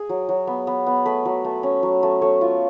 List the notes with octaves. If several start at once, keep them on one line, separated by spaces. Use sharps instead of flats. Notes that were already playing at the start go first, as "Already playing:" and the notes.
Already playing: G#4
F#3
F#3
B3
B3
B3
A3 B4
F#3
A3
C#4
F#3
A3
A3 C#5
F4